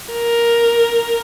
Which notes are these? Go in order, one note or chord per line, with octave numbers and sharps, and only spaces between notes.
A#4